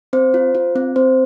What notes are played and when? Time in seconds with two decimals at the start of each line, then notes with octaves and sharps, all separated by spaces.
0.13 C4 C5
0.34 F4
0.55 F4
0.76 C4
0.96 C4 C5